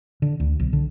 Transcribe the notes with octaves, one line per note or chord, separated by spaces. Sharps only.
D3
D2
B1
D3